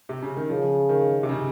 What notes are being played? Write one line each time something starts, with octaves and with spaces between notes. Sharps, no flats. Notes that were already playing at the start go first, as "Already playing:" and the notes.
C3
C#3
D#3
C#3 F3
D#3
C3
C#3